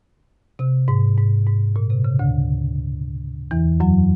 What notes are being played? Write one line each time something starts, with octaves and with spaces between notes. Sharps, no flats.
C3
G#2
G#2
G#2
A#2
C3
C#3
D2 D3
E2 E3
F#2 F#3